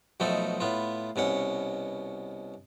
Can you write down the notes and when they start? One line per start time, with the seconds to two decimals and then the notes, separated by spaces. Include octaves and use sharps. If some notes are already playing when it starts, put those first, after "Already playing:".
0.20 B1 B2 F3 A3 D#4 A4
0.60 A2 B3 F4
1.16 C2 B2 C#4 F#5